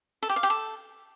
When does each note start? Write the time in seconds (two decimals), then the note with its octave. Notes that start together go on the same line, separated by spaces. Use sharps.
0.23 A4
0.29 G4
0.36 F5
0.43 G4
0.50 A4